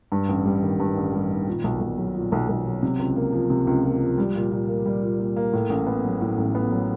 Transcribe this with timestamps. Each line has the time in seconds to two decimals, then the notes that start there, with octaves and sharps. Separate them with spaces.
0.12 G2
0.29 A1
0.46 G3
0.63 D#3
0.80 G2
0.97 A1
1.13 G3
1.30 D#3
1.47 A#2
1.64 B1
1.81 B1
1.98 F#3
2.15 A#2
2.32 B1
2.49 B1
2.66 F#3
2.83 C3
2.99 C#2
3.16 A#3
3.33 F3
3.50 C3
3.67 C#2
3.84 A#3
4.01 F3
4.18 G3
4.35 A#2
4.51 A#2
4.68 A#3
4.86 G3
5.02 A#2
5.19 A#2
5.36 A#3
5.53 A2
5.70 A1
5.87 B3
6.05 F#3
6.21 A2
6.38 A1
6.55 B3
6.72 F#3